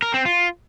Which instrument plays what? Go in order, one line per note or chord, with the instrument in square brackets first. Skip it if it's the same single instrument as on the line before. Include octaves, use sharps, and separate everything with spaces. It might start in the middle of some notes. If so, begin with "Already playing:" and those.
[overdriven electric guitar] A#4
C4
F4